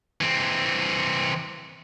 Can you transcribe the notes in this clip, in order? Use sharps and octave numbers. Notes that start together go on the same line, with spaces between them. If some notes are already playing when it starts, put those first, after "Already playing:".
E3 C4